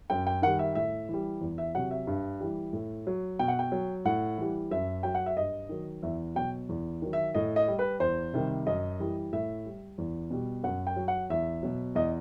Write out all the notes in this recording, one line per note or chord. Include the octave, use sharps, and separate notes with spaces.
F#2 G5
G5
D#3 G3 F#5
E5
A2 E5
E3 G3
E2
E5
C3 F#3 F#5
E5
G2
E3 G3
A2
F#3
B2 G5
F#5
G5
F#3
A2 F#5
E3 G3
F#2 E5
F#3 G5
F#5
E5
G2 D#5
D#3 F#3
E2 E5
B2 F#3 G5
E2
D#3 F#3
E5
A2 D#5
D#5
G3
B4
E2 C5
C3 D#3 G3
F#2 D#5
E3 G3
A2 E5
G3
E2
B2 G3
F#2 F#5
G5
F#3
F#5
E2 E5
B2 F#3
E2 D#5